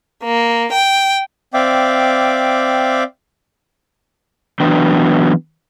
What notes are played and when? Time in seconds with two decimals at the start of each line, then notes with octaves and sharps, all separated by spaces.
0.24 A#3
0.73 G5
1.54 C4 D5 E5 F5 G5 D6
4.60 E3 F#3 B3 D4 G5